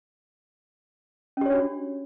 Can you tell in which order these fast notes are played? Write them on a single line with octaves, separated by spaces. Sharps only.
C#4 G4 C#5 D4 F#4